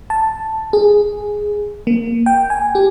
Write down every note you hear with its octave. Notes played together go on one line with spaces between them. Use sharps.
A5
G#4
A#3
G5
G#5
G4